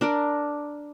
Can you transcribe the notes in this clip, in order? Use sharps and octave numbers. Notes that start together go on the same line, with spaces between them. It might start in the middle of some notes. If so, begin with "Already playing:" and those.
D4 A#4 D5